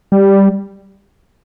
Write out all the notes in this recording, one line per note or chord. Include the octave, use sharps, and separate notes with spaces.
G3